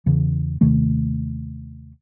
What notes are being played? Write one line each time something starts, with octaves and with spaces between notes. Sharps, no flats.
E2 C#3 E3
D#2 C3 D#3 A3